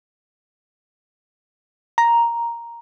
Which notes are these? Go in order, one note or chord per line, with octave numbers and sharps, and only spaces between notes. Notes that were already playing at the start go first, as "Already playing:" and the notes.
A#5